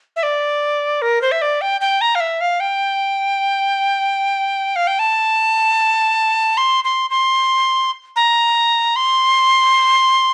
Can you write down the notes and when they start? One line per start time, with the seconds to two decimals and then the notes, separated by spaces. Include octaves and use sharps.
0.16 E5
0.23 D5
1.02 A#4
1.22 C5
1.32 E5
1.42 D5
1.61 G5
1.81 G5
2.01 A#5
2.15 F5
2.20 E5
2.41 F5
2.60 G5
4.76 F5
4.87 G5
4.99 A5
6.57 C6
6.84 C6
7.10 C6
8.16 A#5
8.96 C6